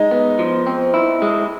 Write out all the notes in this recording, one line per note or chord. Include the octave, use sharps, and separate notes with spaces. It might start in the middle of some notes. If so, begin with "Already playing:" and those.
Already playing: G#3 D#4
B3
F3
C4
E4
G#3